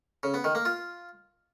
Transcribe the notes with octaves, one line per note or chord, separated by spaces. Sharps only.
C#3
B3
D#3
A#3
F4